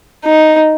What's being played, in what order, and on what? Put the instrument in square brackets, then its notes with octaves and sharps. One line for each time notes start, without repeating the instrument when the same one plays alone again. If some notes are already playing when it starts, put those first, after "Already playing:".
[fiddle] D#4